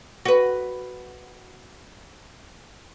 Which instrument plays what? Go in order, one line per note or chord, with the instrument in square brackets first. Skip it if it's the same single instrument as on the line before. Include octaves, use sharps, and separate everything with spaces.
[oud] F#4 B4